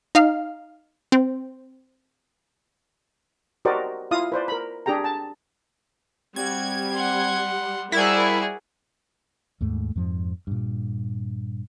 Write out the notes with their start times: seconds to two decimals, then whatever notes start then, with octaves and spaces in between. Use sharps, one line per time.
0.15 D#4 F5
1.12 C4
3.65 F#4 G4 A#4 C5 D5 D#5
4.11 E4 F4 F5 D#6
4.32 B4 C5 D5
4.48 A#4 B5
4.86 D4 G4 G#4 G5 A#5
5.04 A5
6.36 G3 C4 F#4 G#6
6.94 F#5 C6
7.92 G3 E4 F#4 G#4 A#4 C5 D5
9.61 D#2 G#2 A3
9.96 F2 G#2 F3
10.47 G2 A#2